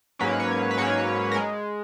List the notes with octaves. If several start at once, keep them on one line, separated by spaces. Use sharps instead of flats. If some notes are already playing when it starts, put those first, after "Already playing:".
G#2 F#3 A#3 C#4 B4
C#5
B4
G#2 F#3 A#3 C#4 C#5
A#4
G#3